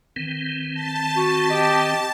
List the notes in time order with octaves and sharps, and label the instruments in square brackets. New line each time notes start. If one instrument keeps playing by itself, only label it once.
[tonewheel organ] D#3 E3 C4
[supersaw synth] A5
[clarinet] F#4
[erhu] G4 [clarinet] D#5